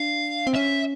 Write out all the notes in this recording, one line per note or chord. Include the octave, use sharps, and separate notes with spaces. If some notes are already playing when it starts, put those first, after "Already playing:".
Already playing: D4 F5
C4
C#4 E5